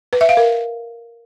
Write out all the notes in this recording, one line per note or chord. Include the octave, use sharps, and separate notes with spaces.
B4
E5
F5
A#4